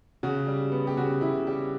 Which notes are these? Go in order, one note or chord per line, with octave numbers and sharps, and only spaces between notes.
C#3 F#4
G3
B3
G4
C#3 F#4
C#3 E4
G3 G4